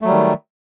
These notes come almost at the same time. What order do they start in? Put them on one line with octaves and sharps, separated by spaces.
A3 F#3 G3 D#3